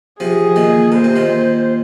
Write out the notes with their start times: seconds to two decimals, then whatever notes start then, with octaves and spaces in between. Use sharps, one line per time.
0.20 C3 F3 G#4
0.56 A#2 D#3
0.92 A#2 C5
1.04 C3
1.16 A#2 D#3